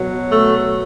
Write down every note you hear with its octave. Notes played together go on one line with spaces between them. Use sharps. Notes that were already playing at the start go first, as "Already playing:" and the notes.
Already playing: B2 F#3
A3